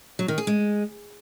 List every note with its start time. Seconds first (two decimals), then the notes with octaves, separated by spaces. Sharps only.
0.19 F#3
0.28 D#3
0.38 G#4
0.47 G#3